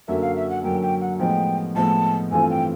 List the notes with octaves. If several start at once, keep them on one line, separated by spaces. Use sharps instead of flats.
F#2 D3 F#3 A#3 E5
F5
E5
F#5
F#2 D3 F#3 A#3 G5
G5
F#5
A2 F3 G#3 B3 D#4 G5
A2 F3 G#3 B3 D#4 A5
G2 E3 A3 C4 F4 G#5
G5